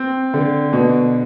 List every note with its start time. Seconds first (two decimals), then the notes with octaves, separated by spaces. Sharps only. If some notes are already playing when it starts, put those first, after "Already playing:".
Already playing: C4
0.34 D3
0.73 B2